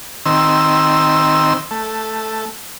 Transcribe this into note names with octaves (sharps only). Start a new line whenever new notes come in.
D#3 C4 E6
A3